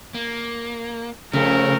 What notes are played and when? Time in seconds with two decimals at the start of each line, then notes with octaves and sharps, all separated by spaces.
0.15 A#3
1.33 F2 C#3 A3 A#4